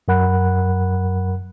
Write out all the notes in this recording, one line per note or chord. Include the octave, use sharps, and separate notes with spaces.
F#2 F#3 A#4 F#5 B5 F#6